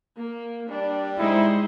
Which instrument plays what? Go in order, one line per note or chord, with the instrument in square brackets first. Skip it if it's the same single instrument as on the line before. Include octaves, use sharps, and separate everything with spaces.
[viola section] A#3
[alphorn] G3 [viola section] D4
[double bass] G#3 [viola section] D#4 C5 [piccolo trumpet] E4